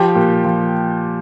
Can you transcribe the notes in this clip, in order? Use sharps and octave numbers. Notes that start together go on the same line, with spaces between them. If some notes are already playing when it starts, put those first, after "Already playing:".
Already playing: F3 G4 G5
A#2
F3